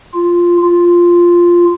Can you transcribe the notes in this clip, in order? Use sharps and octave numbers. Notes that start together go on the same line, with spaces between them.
F4
F4